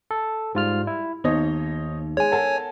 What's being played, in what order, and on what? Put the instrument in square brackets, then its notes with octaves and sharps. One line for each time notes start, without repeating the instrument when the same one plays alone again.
[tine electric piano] A4
[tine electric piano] G#2 F4 F6 [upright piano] G3
[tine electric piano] E4
[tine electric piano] D#2 [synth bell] B3 D#4 [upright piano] C5 C#5 D#5
[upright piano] G#3 [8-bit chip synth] C#5 G#5
[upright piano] A4 A#4 A5 [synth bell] F#5